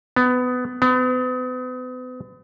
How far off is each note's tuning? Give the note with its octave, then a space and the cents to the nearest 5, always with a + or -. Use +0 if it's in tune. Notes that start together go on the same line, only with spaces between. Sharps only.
B3 +20
B3 +40